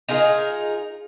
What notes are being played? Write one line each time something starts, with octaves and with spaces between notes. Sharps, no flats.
D#4 F4 G#4 A#4